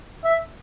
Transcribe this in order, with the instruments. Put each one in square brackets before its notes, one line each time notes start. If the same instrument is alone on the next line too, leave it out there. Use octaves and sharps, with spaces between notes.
[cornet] E5